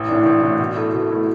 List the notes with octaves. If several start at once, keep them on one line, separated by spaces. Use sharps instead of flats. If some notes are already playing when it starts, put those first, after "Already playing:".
Already playing: A1
A2 E3 D4
A1
A2 E3 D4
B2
A3 E4 A4
B2
A3 E4 A4